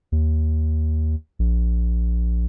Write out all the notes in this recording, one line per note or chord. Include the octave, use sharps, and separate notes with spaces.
D#2
A#1